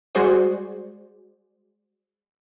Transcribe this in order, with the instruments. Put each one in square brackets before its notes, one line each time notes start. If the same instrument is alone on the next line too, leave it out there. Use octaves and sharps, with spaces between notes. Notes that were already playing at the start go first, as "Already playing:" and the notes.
[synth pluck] G3 G#3 F#4 G#4 C5 D5